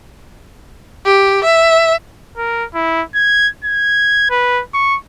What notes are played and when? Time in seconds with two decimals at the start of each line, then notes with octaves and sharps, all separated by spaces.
1.06 G4
1.44 E5
2.37 A#4
2.75 E4
3.15 G#6
3.65 G#6
4.30 B4
4.74 C#6